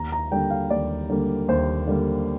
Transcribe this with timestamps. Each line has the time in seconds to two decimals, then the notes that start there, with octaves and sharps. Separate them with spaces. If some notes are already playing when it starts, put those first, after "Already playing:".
Already playing: D#2 A#5
0.12 A#5
0.31 D3 G3 A#3 G5
0.50 F5
0.70 D#2 D5
1.10 D3 G3 A#3
1.48 D#2 C5
1.87 D3 G3 A#3